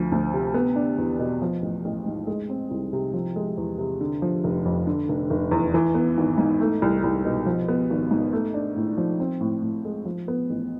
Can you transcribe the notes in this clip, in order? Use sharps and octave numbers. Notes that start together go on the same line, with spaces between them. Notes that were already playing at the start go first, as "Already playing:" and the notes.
Already playing: D2 F3
D2
C3
B3
D4
E2
B2
F3
A1
A1
G#2
G#3
C4
C2
C3
F3
G#3
E2
C3
D3
F3
F1
F2
D3
F1
F1
E2
E3
B3
G#1
G#2
A3
C2
C2
B2
F3
B3
G#1
G#2
A3
D4
A2
F3
C4
A2
A2
G#3
F3
B3
A1